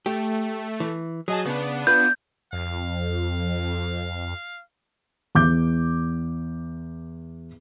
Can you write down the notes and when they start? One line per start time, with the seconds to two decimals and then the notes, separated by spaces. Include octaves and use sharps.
0.06 A3 G4
0.80 E3
1.28 F#3 G#4 D#5 A5
1.45 C#3 B3 D4
1.87 F4 B4 G6
2.53 F2 F5
5.35 E2 D6 G6